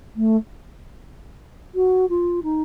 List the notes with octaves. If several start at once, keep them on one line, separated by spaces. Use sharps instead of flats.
A3
F#4
F4
D#4